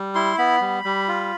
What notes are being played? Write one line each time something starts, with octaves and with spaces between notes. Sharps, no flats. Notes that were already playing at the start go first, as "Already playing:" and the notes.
Already playing: G3
E4 C6
B3 B5
G3
G3
F4